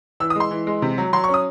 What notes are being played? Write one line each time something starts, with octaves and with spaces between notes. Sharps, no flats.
E3 E6
D#6
G#3 C6
E3
G#3
C3
F#3
F#3 C6
C#6
C#4
D#6